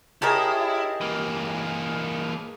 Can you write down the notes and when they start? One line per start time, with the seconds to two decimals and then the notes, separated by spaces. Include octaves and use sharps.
0.22 E4 G4 G#4 A#4 C#5 D#5 A5
1.01 E3 A#3